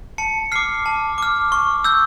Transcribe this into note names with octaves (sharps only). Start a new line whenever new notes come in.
A5 C#7
D6 F6 C7
A5
D6 F6
C#6
E6 G6